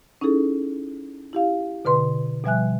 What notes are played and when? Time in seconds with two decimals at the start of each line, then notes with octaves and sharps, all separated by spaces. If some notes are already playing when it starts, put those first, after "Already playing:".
0.21 C#4 D#4 E4 G#4 A4
1.33 E4 G4 F5
1.85 B2 D3 B4 C6
2.44 B2 F3 G3 E5 G#5 F#6